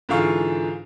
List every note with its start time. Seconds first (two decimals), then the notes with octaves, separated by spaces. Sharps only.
0.09 G#2 D3 E3 F4 F5 C#6